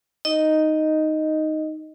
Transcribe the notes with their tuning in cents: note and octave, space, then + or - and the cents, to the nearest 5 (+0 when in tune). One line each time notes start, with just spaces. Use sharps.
D#4 +0 D#5 +0